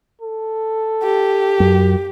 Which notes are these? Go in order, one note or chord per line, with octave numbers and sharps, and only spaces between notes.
A4
G4
F#2